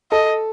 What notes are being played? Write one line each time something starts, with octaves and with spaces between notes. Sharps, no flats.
A4 D#5